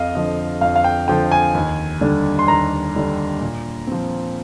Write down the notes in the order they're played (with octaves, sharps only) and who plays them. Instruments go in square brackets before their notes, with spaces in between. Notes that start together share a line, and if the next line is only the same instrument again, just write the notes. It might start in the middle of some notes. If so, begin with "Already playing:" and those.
Already playing: [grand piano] F2 D#5 F5
D3 F3 D#5
F2 F5
F5
G5
D3 F3 G5
G#5
D#2
D3 G3 D4
C6
D#2 A#5
D3 G3 D4
A#2
F3 C4